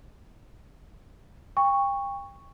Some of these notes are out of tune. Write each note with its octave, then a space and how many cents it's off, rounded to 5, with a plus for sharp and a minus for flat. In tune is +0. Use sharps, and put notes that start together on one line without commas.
G5 +30 C#6 +0